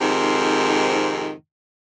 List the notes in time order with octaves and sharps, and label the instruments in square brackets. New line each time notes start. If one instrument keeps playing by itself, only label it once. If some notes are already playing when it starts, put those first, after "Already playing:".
[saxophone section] F2 G#2 C3 D#3